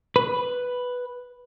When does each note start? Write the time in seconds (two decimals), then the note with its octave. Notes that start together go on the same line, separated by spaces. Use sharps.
0.16 B4